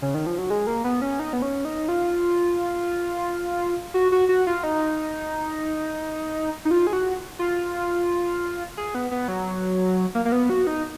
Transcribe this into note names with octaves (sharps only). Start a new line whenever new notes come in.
C#3
D#3
F3
F#3
G#3
A#3
B3
C#4
D#4
B3
C#4
D#4
F4
F#4
F#4
F#4
F4
D#4
D#4
F4
G#4
F#4
F4
G#4
B3
B3
F#3
A#3
A#3
B3
F#4
D#4